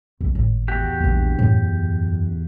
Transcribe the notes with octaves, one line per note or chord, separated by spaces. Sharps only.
B1 F2
G#1 A2
E2 F#4 G4
D#1 A#1 D4
F#2 A2